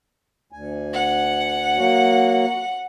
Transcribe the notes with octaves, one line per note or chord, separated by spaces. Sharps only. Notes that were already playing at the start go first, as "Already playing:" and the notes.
D2 G#5
F#5
F#3 A#3 F#4